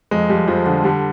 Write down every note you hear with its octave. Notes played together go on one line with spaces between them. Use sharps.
F2 G#3
F2 G3
F2 F3
D3 F3
D3 G3